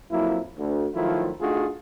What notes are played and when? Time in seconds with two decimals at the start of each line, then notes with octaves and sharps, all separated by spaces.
0.12 F2 F#3 A#3 E4
0.58 D2
0.94 D#3 F3 F#3 A3 E4 F4
1.40 A3 D4 D#4 F4 F#4 G#4